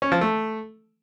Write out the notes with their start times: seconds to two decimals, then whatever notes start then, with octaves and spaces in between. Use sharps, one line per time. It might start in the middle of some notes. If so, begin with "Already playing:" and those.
0.02 C#4
0.12 F3
0.21 A3